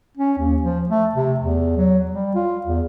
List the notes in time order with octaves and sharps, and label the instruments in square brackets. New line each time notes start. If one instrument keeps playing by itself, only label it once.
[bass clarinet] C#4
D#2
F3
A3
C3
E2
F#3
G3
F4
E2